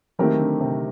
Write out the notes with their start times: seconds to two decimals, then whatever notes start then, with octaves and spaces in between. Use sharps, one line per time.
0.19 D#3 F#3 A3 C4 G4 A#4
0.39 D3
0.61 C3